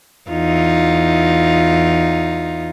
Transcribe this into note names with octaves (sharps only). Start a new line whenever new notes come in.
E2 D#4 F4